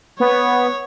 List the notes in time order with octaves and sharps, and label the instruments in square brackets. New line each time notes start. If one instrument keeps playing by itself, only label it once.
[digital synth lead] B3 [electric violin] C#5